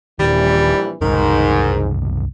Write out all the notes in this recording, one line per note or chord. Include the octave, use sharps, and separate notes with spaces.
D#1 A#1 D#3 E3 G3
F#1 C2 G#2 D#3